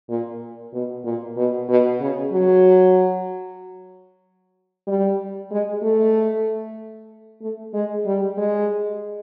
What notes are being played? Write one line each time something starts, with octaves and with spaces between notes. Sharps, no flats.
A#2
B2
A#2
B2
B2
C#3
F#3
G3
G#3
A3
A3
G#3
G3
G#3